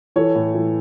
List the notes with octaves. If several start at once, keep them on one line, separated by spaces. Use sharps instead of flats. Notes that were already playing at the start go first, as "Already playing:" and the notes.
E3 A4 C#5
A2
E3